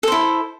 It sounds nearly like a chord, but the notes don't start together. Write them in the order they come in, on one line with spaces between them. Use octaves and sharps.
A4 C5 E4